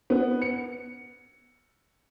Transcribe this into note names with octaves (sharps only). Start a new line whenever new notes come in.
B3
C#7